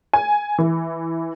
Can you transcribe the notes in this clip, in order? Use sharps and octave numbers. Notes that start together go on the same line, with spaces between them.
G#5
E3